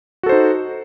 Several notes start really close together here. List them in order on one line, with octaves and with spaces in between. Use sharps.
F#4 A4 C5 D#4